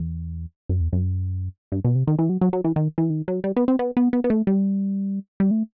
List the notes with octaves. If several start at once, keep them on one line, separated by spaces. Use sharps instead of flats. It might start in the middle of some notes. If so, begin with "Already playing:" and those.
Already playing: E2
F#2
E2
F#2
G2
B2
C3
D#3
E3
F#3
F#3
F#3
E3
D#3
E3
D#3
F#3
G3
B3
C4
B3
B3
B3
B3
A3
G3
G3
A3